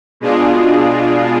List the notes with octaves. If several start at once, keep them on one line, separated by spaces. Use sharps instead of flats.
B2 G#3 D4 F4 G#4